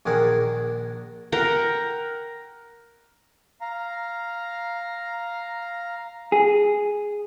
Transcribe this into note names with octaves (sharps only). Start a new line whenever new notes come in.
A#1 D#3 D4 G#4 A#4 F#5
A#4 F#5 G5
F5 A#5
G#4